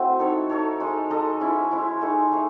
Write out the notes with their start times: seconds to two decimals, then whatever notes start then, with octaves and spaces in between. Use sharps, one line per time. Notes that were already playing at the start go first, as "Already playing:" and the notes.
Already playing: A3 C4 E4 F#4
0.19 D#4 A4 C#5
0.49 D#4 A4 C#5
0.80 G#3 D#4 A4 D#5
1.10 G#3 D#4 A4 D#5
1.40 G#3 C#4 E4
1.71 G#3 C#4 E4
2.01 A3 D#4 G#4 C#5
2.31 A3 D#4 G#4 C#5